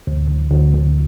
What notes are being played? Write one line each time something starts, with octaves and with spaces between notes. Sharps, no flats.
D2
D2
D2
D2